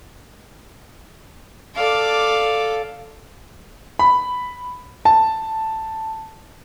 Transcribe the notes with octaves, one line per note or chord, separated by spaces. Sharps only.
A4 D5 F5 D6
B5
A5